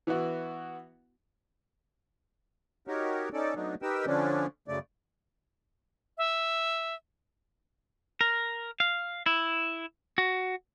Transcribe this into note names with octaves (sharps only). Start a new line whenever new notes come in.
E3 B3 E4 F#4
D#4 F#4 G4 A#4 C#5
C#4 D#4 A4 D5
F#3 A3 B3 D4 D#4
D#4 G4 A#4 B4 G5 E6
D3 F3 C#4 D4
F#2 C#3 A3 D5
E5
A#4
F5
E4
F#4